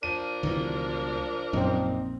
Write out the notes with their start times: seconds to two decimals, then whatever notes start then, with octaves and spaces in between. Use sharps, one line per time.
0.03 F3 D4 A#4 D#7
0.43 C#2 B2 D#3 E3 G3
1.53 A#1 F#2 A#2 C4 C#4 D#4